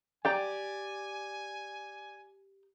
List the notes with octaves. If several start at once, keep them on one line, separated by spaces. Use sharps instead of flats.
G4 D5 G5 G#5 A#5